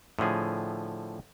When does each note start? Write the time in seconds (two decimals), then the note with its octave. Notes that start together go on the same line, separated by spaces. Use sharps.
0.19 A2 D3 F3 G#4